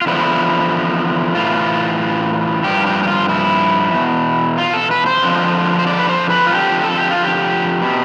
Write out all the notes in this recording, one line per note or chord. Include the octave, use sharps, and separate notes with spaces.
F4
E2 D3 F3 E4
A2 E3 F4
G2 F3 G4
G4
G4
F4
E4
E2 B2
F4
A4
B4
C5
F2 D3 F3
C5
D5
B4
C5
B4
F4
F2 D3 F3 G4
A4
G4
F4
G4
B2